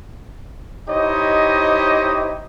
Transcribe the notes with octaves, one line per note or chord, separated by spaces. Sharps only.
D#4 E4 G4 C5 C#5 D#5